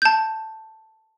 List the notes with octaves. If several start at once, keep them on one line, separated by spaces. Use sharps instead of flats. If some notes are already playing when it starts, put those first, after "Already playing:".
A5 G6